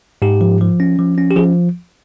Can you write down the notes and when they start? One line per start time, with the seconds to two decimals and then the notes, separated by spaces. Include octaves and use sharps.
0.22 G#2 G4
0.41 F3
0.61 F3
0.80 C#4
0.99 F3
1.18 C#4
1.31 G4
1.36 F3 G#4